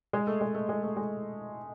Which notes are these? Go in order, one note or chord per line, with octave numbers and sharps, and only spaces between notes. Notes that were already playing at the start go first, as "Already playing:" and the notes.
G#3
A3
G#3
A3
G#3
A3
G#3